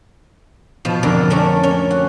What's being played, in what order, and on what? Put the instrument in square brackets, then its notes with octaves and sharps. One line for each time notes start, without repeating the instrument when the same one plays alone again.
[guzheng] B2 F3
F2 D3 A#4 D5
A3 C#4 A#4 D5
C#4
F#4